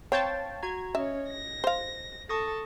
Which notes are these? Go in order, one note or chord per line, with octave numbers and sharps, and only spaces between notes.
C4 C#5 F5 G5 A5 A6
F#4 A#5 G#6
C#4 C#5 D#5 E5
A#6
C5 F5
A4 A5 C#6 D#6 A#6